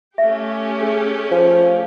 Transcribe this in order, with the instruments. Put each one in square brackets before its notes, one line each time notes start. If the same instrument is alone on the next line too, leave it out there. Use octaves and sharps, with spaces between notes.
[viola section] A3 C#4 G4 [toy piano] E5
[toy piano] G#4
[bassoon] F3